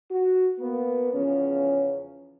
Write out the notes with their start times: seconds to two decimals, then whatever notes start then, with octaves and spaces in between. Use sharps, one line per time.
0.11 F#4
0.60 A#3 B3
1.13 E2 C#3 F3 C#4